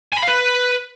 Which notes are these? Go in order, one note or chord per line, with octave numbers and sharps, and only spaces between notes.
G#5
B5
F5
B4